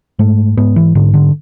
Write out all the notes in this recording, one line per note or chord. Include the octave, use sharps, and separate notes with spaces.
G#2 A3
G#2 B3
E3
G#2 D3
D3